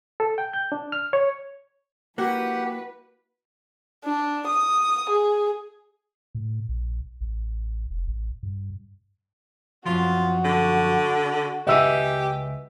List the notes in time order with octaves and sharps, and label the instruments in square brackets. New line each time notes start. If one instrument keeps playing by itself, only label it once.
[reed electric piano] A4
G5
G6
D4
F6
C#5
[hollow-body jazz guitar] A#3 [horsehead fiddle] E4 B4 [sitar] F#4 [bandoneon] G4 F#5
[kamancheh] D4
D#6
G#4
[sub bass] A2
A#1
A1
F1
A1
G2
[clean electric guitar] F#2 F3 [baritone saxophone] F4 [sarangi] F#4
[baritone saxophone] D3
[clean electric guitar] C#2 B4 G#5 [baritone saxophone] G4 [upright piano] D#5 E5 E6